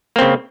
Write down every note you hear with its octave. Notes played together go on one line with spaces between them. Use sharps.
C#3 A#3 C4